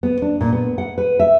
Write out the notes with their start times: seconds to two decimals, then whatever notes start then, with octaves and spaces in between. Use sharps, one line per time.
0.03 B3
0.22 D4
0.41 A#2
0.53 B3
0.78 F#5
0.98 B4
1.20 E5